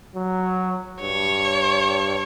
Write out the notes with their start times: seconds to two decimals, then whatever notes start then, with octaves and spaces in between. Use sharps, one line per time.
0.15 F#3
1.01 G2 C#5